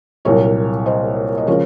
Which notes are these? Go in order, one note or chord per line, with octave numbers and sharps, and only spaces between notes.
C2 A#2 F#3 A#4 C#5
C5 D#5
D#5
C#3 F3 G#3 A#4 C#5